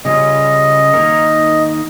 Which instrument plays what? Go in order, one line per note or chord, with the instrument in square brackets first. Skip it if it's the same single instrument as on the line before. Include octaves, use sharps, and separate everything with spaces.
[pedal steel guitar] C#3 G3 C#4 F4 [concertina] D#5
[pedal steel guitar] D#3 A#3 D#4 A#4
[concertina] D#5